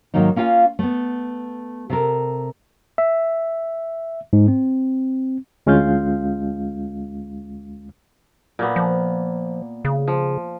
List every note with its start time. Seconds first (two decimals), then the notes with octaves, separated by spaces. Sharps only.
0.14 G#2 D#3 F#3 A#3 D#4
0.36 A#3 C#4 F4 F5 G#5
0.79 A3 B3
1.90 C3 A4 A#4
2.98 E5
4.33 G#2
4.48 C4
5.66 D2 G#3 C#4 F4 F5 G6
8.59 A#2 A#3 B3
8.76 F3
9.85 C#3
10.08 F3